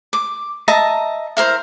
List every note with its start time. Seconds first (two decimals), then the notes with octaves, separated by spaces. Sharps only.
0.13 D6
0.68 D#5 E5 A5 A#5
1.37 E4 A#4 C5